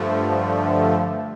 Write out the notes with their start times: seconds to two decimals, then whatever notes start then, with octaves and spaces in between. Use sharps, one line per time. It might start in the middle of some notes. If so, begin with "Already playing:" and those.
Already playing: G2 D3 F3 A3